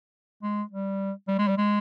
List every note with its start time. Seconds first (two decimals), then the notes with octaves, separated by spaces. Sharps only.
0.43 G#3
0.71 G3
1.28 G3
1.39 G#3
1.48 G3
1.57 G#3